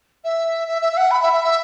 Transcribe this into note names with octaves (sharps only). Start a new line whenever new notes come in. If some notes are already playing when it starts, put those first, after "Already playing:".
E5
E5
E5
E5
F#5
B5
E5
E5
E5